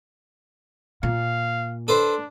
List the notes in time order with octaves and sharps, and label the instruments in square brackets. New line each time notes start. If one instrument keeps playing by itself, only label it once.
[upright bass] A#2 [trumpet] F5
[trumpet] D4 [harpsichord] A4 B4 C5